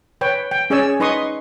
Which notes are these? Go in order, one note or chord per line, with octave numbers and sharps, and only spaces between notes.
B4 C#5 G5
G5
C#4 G#4 C#5 D5 G#5 E6
D#4 B4 D#5 C6 C#6 D#6